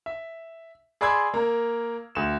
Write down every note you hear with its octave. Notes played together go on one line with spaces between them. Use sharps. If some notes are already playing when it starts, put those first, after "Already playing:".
E5
G#4 D5 B5 C6 E6 G#6
A#3 A#4
D2 E7